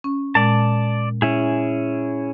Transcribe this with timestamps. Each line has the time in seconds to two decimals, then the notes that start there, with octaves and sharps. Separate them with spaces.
0.04 C#4
0.35 A#2 G#3 D5 A5
1.22 C#4 E4 G#4